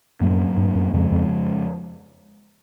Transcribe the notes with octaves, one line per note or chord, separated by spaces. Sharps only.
F#2 A2 F#3 A#3
G2
F#2
F2 C#3 F3 G#3
F2